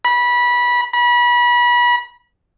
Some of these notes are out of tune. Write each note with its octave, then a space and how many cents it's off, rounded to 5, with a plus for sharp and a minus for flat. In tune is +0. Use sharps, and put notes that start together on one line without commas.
B5 -20
B5 -30